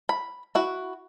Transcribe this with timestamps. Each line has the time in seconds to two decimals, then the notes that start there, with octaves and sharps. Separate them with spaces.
0.09 B5
0.55 E4 F#4